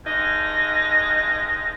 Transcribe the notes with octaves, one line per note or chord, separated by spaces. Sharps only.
G2 G#3 D#4 A#6